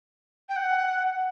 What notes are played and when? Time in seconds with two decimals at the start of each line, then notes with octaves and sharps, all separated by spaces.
0.49 G5
0.56 F#5